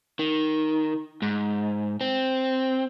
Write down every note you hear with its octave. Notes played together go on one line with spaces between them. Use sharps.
D#3
G#2
C4